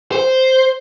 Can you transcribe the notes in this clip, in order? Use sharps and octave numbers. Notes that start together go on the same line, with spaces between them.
C5